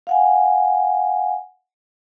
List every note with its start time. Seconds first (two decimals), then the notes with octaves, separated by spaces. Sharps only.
0.07 F5 F#5 G#5